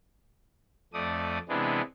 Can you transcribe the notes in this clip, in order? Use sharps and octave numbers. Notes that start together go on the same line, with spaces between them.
F2 A3 D5 D#6
C3 E3 G#3 B3 D4